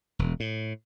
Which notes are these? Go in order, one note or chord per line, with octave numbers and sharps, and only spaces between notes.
E1
A2